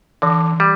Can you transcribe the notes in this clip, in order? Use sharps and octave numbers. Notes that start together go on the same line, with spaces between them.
D3 E3
G3